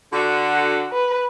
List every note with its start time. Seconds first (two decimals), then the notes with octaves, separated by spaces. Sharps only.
0.13 D3 F#4
0.93 B4